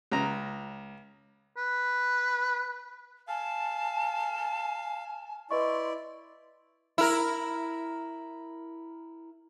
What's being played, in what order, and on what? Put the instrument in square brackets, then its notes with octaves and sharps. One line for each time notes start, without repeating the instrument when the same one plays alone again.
[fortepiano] C#2 A#5
[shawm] B4
[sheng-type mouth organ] F5 [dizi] G#5 [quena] A5
[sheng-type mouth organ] E4 D5 [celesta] B4 D#5 C#6 [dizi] C6
[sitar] E4 A#4